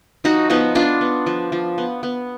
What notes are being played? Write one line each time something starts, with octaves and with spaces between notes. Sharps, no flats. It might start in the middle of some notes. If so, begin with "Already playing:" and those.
F3 D#4 F#4
F3 B3 D#4
B3 D4 F4
B3
F3
F3
B3
B3